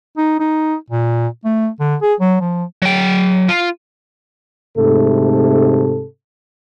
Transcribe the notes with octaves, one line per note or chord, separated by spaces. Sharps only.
D#4
D#4
A#2
A3
D3
G#4
F#3
F3
F#3 G5
F4
G#2 C3 A3 A4